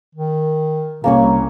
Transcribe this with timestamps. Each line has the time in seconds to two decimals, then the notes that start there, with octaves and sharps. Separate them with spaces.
0.15 D#3
1.04 C2 A#3 C#4 C#5